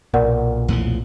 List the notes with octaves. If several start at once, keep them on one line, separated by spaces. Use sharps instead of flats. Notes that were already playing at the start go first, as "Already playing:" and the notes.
B1 A#2 A#4 D5 F#5
E2 A2 F3